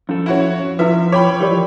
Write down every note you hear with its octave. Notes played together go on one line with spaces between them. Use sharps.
F2 C#4 A4
E4 F#4 C#5
F3 E4 A4 B4 E5
C#5 G5 B5 D6
E3 F3 G4 A#4 D5